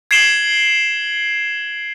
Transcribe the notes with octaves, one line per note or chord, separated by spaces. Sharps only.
G#6 C7 D7 E7 F#7 G7